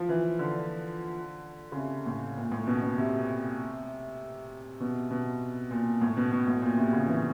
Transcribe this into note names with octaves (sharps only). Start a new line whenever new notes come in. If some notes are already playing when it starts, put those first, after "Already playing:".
Already playing: F3
E3
D3
C#3
C3
A2
A#2
A2
B2
B2
C3
B2
B2
A#2
A2
B2
B2
A2
A#2
C3
C#3
E3